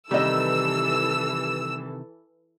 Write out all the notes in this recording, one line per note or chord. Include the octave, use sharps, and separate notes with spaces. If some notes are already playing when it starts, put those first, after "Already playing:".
C3 D#3 E3 G3 A4 D#5 E6